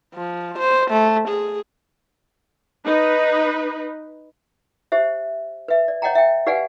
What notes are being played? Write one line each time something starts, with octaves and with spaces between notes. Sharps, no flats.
F3
C5
A3
G#4
D#4 B4
G4 C5 E5
B4 E5
D5
C#5 D#5 F#5 G5 A#5
E5 G5
G4 B4 D5 F5 F#5 G#5